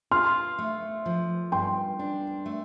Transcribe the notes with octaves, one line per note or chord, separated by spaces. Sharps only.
F4 C6 F6
A3
F3
G2 G5 C6
D4
A3